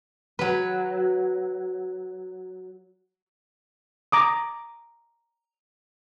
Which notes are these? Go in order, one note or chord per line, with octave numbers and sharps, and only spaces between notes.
F#3 B4
A#5 D6 D#6